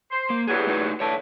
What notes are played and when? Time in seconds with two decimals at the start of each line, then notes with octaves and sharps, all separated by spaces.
0.11 C5
0.30 A#3
0.47 E2 G2 F#3 G4 G#4
0.67 A3 D#4 B4
1.00 D3 E3 C#5 A5